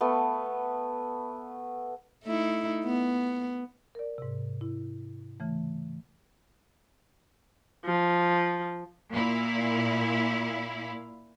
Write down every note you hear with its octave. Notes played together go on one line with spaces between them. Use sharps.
A3 B3
A3 D#4 E4
B3
A#4 D5
G#2 C3
E4
C#3 E3 A3
F3
A#2 E4 F5